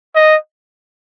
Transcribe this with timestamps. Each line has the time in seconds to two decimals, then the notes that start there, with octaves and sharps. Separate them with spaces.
0.15 D#5